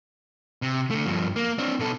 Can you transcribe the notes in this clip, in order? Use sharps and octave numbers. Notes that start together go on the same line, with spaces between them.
C3
D3 A3
G2 F3
A#3
C4 D4
B2 A4